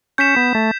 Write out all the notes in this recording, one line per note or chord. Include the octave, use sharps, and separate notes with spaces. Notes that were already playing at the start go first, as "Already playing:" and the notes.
C#4 G6 B6 E7
B3
A3